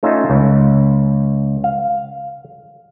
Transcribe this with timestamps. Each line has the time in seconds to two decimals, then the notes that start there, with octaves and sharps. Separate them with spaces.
0.03 A3 C#4 D#4 F4 E5
0.30 C#2
1.64 F5